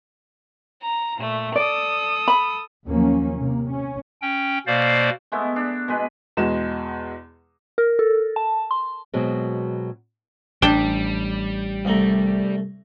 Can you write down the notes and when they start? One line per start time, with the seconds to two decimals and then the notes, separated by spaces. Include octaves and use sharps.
0.83 A#5
1.17 A#2 A3
1.56 A4 D5 D#6
2.28 B5
2.87 D#2 F3 F#3 A#3 C#4
3.38 C3 A#3
3.69 C#4
4.22 C#4 G5
4.67 B2 A#3 C5 D5 F5
5.32 G#3 A3 B3 E4
5.56 D4
5.88 B2 G#3 B4
6.37 E2 B2 G#3 E7
7.78 A#4
7.99 A4
8.36 A5
8.71 C6
9.13 B2 F#3 G#3 C4
10.62 A1 G3 D4 G5
11.85 C2 A3 A#5